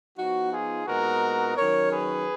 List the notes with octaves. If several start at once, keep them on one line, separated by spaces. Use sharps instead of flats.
F3 B3 D#4 F#4
F4 G#4
A#2 G#3 B3 D#4 F#4 A#4
D#3 F#3 C#4 A#4 C#5
G#4 B4